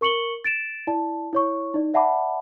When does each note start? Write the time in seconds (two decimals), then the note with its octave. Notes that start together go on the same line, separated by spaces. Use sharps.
0.01 A#4 C#6 C#7 F#7 G7
0.44 A6 D7 E7
0.87 E4 D5 A5
1.33 E4 C#5 C#6
1.74 D#4 D5
1.94 D5 E5 F#5 A5 B5 D6